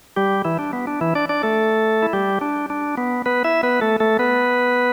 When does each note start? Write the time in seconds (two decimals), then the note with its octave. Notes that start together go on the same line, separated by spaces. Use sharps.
0.16 G3 G4
0.45 E3 E4
0.59 D4
0.73 B3
0.87 D4
1.01 E3 E4
1.15 D4 D5
1.29 D4 D5
1.43 A3 A4
2.02 E4
2.13 G3 G4
2.41 D4
2.70 D4
2.97 B3
3.26 B3 B4
3.44 E4 E5
3.63 B3 B4
3.81 A3 A4
4.00 A3 A4
4.19 B3 B4